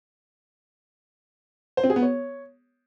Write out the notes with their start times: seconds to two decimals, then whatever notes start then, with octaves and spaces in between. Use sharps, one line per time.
1.77 C5
1.84 C4
1.90 G#4
1.96 B3
2.02 C#5